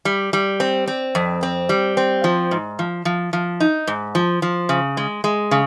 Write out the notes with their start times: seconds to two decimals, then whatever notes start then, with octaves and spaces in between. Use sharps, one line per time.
0.05 G3
0.33 G3
0.60 C4
0.88 C4
1.15 F2
1.43 C4
1.69 G3
1.97 C4
2.24 F3
2.51 G#2
2.79 F3
3.05 F3
3.33 F3
3.60 D#4
3.87 G#2
4.15 F3
4.42 F3
4.69 C#3
4.97 G#3
5.24 G#3
5.51 C#3